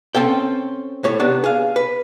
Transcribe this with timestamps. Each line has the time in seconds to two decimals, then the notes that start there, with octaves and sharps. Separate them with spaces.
0.15 C4 C#4 A4 G5
1.04 A2 A3 C#5
1.20 C3 B3 D4
1.44 G#4 F5
1.76 B4